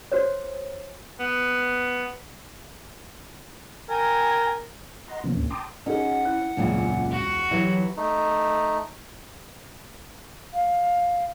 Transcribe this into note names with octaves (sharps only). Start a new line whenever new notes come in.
F#4 C5 C#5
B3
A#4 G5 G#5 G#6
D#5 F#5 A#5 C6
C3 E3 F3 A#3 B3 C#4
D2 G#2 B2 A#3 C#4
G5 A5 A#5 C6 D6 D#6
C#4 D#4 F#4 G#4 F#5
E4 F#6
E1 C#2 F#2 A#2 C#3
F#4
E3 F#3 E4 G4
A3 D#4
F5